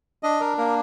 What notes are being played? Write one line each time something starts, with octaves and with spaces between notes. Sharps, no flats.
D4 D#5
A#4
A#3 A#4